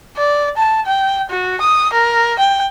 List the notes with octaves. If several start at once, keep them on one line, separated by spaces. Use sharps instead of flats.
D5
A5
G5
F#4
D#6
A#4
G5